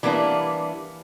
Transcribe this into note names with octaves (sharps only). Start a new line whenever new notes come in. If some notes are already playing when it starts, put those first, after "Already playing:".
E3 G3 A#3 B3 D4 E4